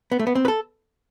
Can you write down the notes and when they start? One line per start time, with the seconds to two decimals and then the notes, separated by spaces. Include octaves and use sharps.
0.12 B3
0.19 A3
0.27 B3
0.35 C4
0.45 B4
0.48 A4